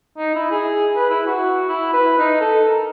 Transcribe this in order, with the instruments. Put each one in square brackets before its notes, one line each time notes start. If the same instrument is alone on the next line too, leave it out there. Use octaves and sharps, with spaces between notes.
[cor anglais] D#4
E4
G#4
B4
E4
F#4
E4
B4
D#4
A4
A#4